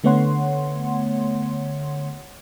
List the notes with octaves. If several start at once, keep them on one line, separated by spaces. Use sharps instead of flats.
D3 A3 B3 C#5 F#5 C6